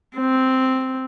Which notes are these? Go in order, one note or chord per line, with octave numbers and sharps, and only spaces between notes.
C4